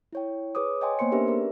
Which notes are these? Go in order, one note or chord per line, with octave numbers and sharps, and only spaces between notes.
E4 C#5 G5
G#4 B4 C#5 D6 D#6
C#5 D#5 G5 G#5 C6
A#3 B3 C5 C6 C#7
C#4 D4 G4 A#4 B4 E5
G#4 A#4 D5